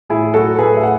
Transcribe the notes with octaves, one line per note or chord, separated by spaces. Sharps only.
A2 E4 G#4
F#3 F#4 A4
A2 G#4 B4
E5
F#5